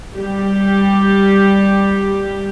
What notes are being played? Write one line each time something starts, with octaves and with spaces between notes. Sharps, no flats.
G3 G4